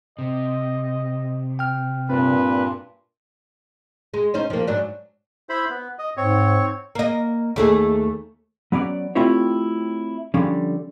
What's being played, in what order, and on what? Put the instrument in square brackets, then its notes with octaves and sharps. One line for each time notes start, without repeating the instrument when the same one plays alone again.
[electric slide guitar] C3 [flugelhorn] D#5
[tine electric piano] G5 F6
[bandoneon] G2 A#2 [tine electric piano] C4 [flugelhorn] B4
[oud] G#3
C#4 D#4 C5
F3 A#3
G#2 F#3 D4
[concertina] E4 C5 B5
B3
D#5
[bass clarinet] G#2 [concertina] C4 C#5
[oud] A#3 D#5
D#2 A3 G#4
[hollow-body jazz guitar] F#3 B3 C#4 D5
A3 C4 E4 F4 G4 C#5
D3 F3 G3 C#4